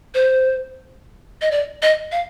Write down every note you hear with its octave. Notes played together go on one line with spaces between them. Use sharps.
C5
D#5
D5
D#5
F5